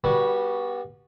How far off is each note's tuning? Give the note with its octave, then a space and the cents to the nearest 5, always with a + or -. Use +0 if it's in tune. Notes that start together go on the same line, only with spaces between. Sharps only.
G3 +0 B3 -25 F#4 +10